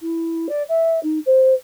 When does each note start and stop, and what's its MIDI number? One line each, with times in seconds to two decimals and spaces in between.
0.02 0.47 64
0.49 0.62 74
0.68 0.99 76
1.03 1.19 63
1.26 1.54 72